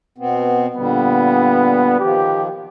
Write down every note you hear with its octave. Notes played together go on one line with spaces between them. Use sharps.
B2 B3 C4
A#2 D3 G3 B3
D#3 F3 G4